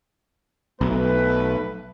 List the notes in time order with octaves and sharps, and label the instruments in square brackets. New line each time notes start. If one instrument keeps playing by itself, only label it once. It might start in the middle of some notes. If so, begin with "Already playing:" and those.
[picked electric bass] B1 [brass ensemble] A3 B4